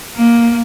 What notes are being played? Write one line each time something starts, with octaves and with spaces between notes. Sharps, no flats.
A#3